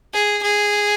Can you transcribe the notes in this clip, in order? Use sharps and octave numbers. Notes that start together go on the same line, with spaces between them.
G#4
G#4